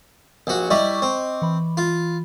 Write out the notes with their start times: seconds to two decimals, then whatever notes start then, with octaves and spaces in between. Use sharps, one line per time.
0.47 A#1 F#4
0.71 G3 E4 D#5 C#6 D6
1.02 C4
1.42 E3 B5
1.77 F4